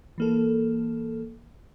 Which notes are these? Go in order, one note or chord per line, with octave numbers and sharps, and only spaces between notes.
E3 A#3 A4